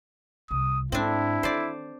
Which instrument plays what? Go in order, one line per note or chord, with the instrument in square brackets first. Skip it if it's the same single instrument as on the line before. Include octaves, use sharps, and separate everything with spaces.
[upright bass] C2 [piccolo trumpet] D#6
[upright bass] G#2 [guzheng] C4 D4 [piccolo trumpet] E4
[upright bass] D#3 [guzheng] C5 D5